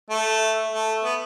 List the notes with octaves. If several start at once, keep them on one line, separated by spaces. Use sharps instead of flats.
A3
A3
B3